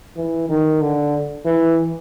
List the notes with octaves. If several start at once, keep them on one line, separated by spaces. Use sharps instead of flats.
E3
D#3
D3
E3